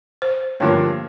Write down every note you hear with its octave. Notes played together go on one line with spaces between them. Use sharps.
C5
G2 D3 F3 A#3 C#5